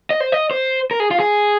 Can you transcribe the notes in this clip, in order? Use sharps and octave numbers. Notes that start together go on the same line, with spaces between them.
D#5
C5
D#5
C5
A#4
G#4
F4
G#4